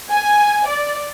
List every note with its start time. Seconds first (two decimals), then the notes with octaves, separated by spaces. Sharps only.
0.10 G#5
0.66 D5